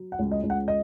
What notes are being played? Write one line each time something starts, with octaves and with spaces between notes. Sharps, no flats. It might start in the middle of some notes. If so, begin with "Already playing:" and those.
Already playing: F#3
F#5
C#2
D#5
C#2
F#5
D#5